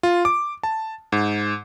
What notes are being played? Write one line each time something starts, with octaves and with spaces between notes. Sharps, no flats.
F4
D6
A5
G#2